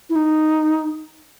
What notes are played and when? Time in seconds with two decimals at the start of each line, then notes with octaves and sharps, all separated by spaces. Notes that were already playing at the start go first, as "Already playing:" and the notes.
0.10 E4
0.16 D#4